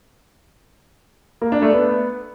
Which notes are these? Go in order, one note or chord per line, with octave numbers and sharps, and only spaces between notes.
A#3
D4
A3
B3